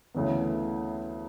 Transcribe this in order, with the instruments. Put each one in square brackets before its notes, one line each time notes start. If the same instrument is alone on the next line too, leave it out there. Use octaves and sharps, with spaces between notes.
[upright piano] D2 C#3 E3 B3